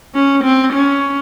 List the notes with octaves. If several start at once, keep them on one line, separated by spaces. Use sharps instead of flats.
C#4
C4
C#4